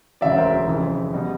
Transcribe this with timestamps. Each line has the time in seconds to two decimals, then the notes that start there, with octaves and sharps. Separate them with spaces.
0.21 E1 D2 C#3 F#3 D5 E5
0.36 A#4 C5
0.67 F1 F2 C#3 E3
1.13 B2 G3